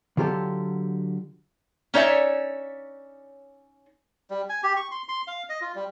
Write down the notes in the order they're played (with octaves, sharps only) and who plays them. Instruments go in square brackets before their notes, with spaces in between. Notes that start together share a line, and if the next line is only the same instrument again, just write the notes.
[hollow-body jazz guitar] D3 F#3 F4 G4 A4
[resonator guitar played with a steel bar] C#4 D#4 C#5 D5 E5
[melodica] G3
G#5
G4
C#6
C6
C6
F5
D#5
F4
G3